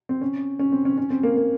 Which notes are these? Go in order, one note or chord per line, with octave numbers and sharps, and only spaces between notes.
C4
C#4
C#4
C4
C#4
C#4
C4
A#3
A#3